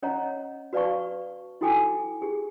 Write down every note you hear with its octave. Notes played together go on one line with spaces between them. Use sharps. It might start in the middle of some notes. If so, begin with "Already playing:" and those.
C#4 C#5 D#5 F#5 A#5
F#4 B4 D5 F5 A5 C#6
E4 F#4 A4 G5 G#5 D6
G4 G#4